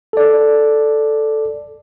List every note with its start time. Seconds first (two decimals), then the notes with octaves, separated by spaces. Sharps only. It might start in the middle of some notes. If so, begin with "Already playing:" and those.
0.13 A4 D5